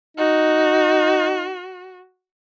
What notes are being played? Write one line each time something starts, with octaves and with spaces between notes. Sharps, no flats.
D#4 F#4